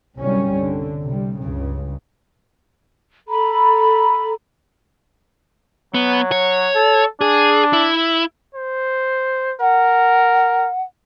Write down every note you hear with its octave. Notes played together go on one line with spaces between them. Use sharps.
G1 C2 F#3 G3 C#4
D3
C3 G3
C#2 G2 C#3
A4 A#5 B5
F#3 B3
C#5
A4
D4 G#4
E4
C5
A#4 F#5